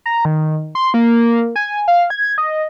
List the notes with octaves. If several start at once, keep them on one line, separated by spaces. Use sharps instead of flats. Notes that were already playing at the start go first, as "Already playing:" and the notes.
A#5
D#3
C6
A#3
G#5
F5
G#6
D#5